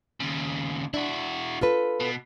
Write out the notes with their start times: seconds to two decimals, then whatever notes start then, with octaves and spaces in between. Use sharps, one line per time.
0.20 D#2 C#3
0.94 D4 E4 F#4
1.61 F4 A4 B4
2.00 B2